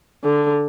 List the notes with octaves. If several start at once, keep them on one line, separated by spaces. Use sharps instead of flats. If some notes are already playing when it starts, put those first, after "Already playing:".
D3